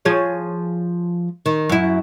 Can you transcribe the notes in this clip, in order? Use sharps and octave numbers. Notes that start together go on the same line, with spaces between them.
F3 G#4 C#5
D#3
F#2 E4